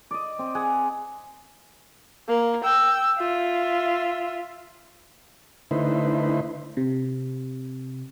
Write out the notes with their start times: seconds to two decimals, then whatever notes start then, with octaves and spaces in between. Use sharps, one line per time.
0.11 D5 D#5
0.39 C4
0.55 G#4 F#5
2.29 A#3
2.64 G5 E6
3.18 F4 E5
5.71 D3 A3 D#4 E4 B4 C5
6.77 C3